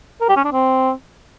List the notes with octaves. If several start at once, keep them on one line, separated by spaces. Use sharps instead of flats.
A#4
G4
C#4
D4
C4